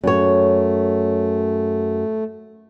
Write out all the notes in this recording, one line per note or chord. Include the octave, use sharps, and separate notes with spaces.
F#2 A3 C#5